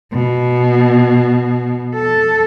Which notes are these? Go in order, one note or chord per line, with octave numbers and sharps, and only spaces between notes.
B2
A4